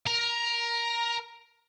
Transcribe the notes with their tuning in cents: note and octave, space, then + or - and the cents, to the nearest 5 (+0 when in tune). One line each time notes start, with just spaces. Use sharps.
A#4 +15 A#5 +0